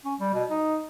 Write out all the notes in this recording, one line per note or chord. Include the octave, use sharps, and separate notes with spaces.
C#4
G3
B2
D#4